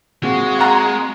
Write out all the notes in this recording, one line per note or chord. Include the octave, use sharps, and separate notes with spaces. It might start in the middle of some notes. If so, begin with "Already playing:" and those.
G#3 A#3 C4 F4 F#4
F#5 A#5